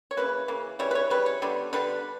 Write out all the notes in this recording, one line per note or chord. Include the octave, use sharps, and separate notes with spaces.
C#5
C#3 E3 A#3 B4
C#3 E3 A#3
C#3 E3 G3 C#5
B4
C#5
C#3 E3 G3 B4
C#5
D3 G3 B3
D3 G3 B3 B4